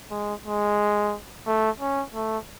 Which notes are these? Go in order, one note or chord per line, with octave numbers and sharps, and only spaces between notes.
G#3
G#3
A3
C#4
A3